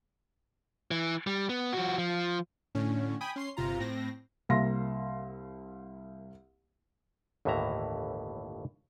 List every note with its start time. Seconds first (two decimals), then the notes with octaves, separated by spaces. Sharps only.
0.91 E3
1.27 G3
1.49 B3
1.73 F3 F#4
1.98 F3
2.75 A2 D3 C#4
3.21 G5 G#5 B5 D#6
3.36 C#4 C6 C7
3.57 G1 C3 F4 A#5
3.79 A2 C4 A#6
4.49 C2 A#3 E5 F5 C6 A#6
7.45 G1 D#2 A2 E3 E5 A#5